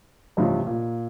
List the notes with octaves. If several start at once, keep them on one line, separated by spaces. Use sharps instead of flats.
A1 G2 C3 F3
A#2